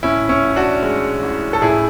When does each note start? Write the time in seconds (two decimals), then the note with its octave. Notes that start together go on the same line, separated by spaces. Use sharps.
0.03 A2 C#4 E4
0.29 C#4 E4
0.42 A1
0.56 D4 F#4
0.83 G#3
1.23 A1
1.53 A4
1.62 A2 E4 G#4